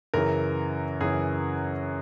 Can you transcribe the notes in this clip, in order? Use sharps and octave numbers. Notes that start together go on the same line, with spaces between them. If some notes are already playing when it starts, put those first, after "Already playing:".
F#2 C#3 E3 A#4
F#2 C#3 E3 G#4